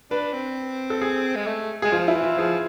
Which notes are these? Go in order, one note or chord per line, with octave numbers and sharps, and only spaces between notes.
D4 B4
C4
A4
G#4
G#3
A3
G#3 G#4
F3 F4
E4
E3
F4
F3 G#4